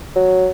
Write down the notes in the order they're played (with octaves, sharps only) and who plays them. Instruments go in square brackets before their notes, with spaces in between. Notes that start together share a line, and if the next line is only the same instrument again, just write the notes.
[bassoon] F#3